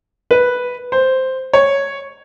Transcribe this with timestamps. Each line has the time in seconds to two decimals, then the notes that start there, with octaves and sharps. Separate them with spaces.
0.31 B4
0.92 C5
1.53 C#5